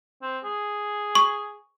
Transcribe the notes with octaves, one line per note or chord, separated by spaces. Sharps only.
C4
G#4
C#6